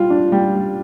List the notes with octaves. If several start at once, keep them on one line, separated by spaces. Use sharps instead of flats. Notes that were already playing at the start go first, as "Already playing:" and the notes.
Already playing: G3 F4
D4
G3
G3